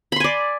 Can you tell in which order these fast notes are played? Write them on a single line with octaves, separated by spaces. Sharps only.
B5 C6 G#5 D5